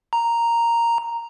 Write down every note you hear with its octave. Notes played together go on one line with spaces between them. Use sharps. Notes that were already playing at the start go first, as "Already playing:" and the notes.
A#5